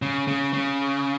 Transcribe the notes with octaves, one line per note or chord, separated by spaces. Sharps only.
C#3
C#3
C#3